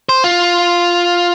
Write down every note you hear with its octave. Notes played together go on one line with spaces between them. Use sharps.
C5
F4